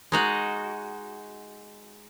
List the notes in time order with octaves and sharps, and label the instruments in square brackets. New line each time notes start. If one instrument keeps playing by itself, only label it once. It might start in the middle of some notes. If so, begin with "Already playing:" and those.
[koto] G#3 D#4 F#4